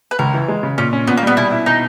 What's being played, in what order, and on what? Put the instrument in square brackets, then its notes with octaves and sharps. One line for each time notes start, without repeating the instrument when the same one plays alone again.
[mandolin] B4
[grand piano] C#2 [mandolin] A#4
[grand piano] E3
G#3
C#3
[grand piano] A#2 [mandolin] C#4
[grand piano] C#4
[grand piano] A#2 [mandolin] B3
[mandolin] A#3
[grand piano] G3 [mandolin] B3
[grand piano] B2 [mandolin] E4
[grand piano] E4
[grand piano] B2 [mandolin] D#4